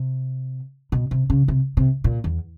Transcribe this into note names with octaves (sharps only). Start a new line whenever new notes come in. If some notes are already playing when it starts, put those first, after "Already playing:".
Already playing: C3
B2
C3
C#3
C3
C3
A#2
E2